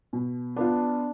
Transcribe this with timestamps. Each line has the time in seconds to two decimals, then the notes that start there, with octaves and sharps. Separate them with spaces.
0.13 B2
0.56 B3 D4 F4